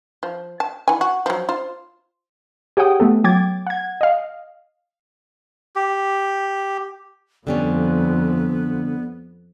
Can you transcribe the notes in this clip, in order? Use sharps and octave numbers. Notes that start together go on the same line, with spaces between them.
F3
A5
E3 G#5
F#4
F3 F#3
F4 C5
G4 G#4 C#5 F#5 G5 D#6
A3 B3 A4
F#3 G5 D6 G#6 A6
F#5 G#6
D#5 F5
G4
F2 D3 G3 B3 C#4